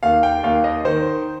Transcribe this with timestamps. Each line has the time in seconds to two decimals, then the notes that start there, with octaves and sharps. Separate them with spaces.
0.03 D#2 F5
0.23 G5
0.43 D#2 F5
0.64 D#5
0.85 D#3 C5